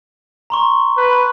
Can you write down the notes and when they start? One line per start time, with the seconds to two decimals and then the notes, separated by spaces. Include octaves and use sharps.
0.50 A#5 C6 C#6
0.97 B4